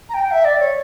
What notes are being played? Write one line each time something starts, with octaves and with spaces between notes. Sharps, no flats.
A#5
G5
E5
D5
C#5